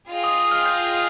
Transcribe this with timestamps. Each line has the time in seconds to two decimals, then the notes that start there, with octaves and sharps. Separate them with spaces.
0.10 F4 G#4 D#5 G5
0.24 D#6
0.38 D#6
0.51 F6
0.66 G6
0.84 G6